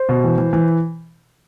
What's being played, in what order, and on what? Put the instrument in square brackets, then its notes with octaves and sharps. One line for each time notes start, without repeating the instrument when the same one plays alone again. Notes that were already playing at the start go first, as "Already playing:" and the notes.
Already playing: [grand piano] C5
B2
E3
E3
E3